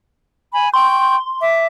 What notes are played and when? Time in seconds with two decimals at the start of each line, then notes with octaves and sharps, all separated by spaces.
0.52 G#5 B5
0.74 G5 C6 C#6 G6
1.42 E5 D6